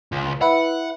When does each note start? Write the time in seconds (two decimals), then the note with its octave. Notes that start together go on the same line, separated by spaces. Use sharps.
0.12 C#2
0.41 E4 B4 F#5